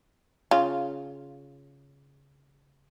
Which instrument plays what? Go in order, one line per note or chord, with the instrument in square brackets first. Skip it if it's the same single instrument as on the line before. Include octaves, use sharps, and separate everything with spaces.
[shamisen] C#3 F4